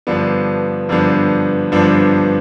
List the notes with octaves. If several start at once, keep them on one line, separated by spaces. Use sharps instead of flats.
G2 D3 F3 B3 D4
G2 D3 F3 B3 D4
G2 D3 F3 B3 D4